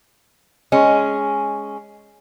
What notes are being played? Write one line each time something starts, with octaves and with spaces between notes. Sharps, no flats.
G#3 C#4